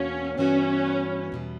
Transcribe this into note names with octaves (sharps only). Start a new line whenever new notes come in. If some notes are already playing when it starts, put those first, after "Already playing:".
Already playing: E2 B2 A#3 C#4 D4 F#4
G2 E3 B3 C#4 F#4 B4
E2 B2 G3